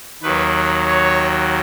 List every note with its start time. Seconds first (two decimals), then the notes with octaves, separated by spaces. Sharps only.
0.22 D#2 D#3 F#3 B4
0.88 C#5